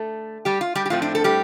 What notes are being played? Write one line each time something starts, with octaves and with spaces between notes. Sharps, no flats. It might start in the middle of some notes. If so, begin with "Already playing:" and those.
Already playing: D3 A3 A4
G3 G4
F4
G3 G4
G4
A2 F3 A3 C4 F4
D4
A4
G3 G4